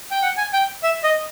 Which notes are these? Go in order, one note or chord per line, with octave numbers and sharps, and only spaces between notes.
G5
F#5
G#5
G5
E5
D#5